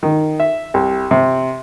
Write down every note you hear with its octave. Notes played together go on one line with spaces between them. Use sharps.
D#3
E5
C2
C3